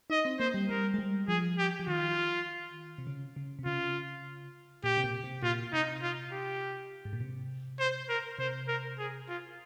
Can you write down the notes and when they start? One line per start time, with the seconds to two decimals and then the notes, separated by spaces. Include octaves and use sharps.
0.10 D#4 D#5
0.25 C4
0.39 A#3 C5
0.54 G3
0.69 G3 A#4
0.94 G#3
0.99 G3
1.28 F3 G#4
1.58 G4
1.80 F3
1.87 D#3 F4
2.98 C3
3.07 C#3
3.36 C#3
3.59 C3
3.65 C#3 F4
4.84 A#2 G4
4.97 C3
5.04 A#2
5.24 C3
5.43 A#2 F4
5.73 C3 D#4
6.03 F4
6.32 G4
7.05 G#2
7.13 A#2
7.21 C3
7.79 C5
8.09 A#4
8.39 C3 C5
8.68 A#4
8.99 G#4
9.28 F4